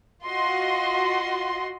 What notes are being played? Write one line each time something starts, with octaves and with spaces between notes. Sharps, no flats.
F4 F#4 D#5 C6